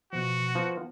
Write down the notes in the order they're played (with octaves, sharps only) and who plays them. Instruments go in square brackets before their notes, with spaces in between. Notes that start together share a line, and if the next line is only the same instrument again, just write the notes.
[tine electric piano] B2 F3 [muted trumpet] F#4
[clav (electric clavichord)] F3 [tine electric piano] B3